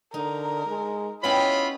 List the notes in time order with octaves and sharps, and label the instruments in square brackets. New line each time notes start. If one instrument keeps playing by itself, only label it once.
[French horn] D3 [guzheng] D#4 [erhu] A#4
[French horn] G#3
[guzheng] B3 C#4 G4 [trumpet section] E4 F4 B5 [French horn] C#5 [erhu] D#5